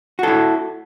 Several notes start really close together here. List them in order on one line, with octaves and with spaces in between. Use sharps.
F#4 A4 E4